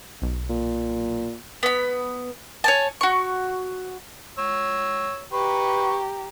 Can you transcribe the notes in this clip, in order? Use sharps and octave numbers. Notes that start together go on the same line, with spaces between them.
B1
A#2
B3 B5
C#5 G#5 A5
F#4 C#6
C#5 E6
G4 B4 A#5 C#6